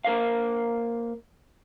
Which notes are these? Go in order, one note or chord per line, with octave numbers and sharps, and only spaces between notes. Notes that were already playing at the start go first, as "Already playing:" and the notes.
A#3 A#4 C5 F5